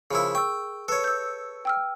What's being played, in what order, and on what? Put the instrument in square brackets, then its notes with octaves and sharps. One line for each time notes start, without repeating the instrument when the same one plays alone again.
[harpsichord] C#3 F3 E4 [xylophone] G#4 A#4
[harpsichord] G5 [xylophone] C#6 E6
[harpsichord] A4 C#5 [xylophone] B4
[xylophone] E6 G6
G5 E6 F6